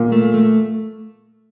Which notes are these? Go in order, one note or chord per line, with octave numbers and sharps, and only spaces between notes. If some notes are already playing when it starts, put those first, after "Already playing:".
Already playing: A#2
A3
A3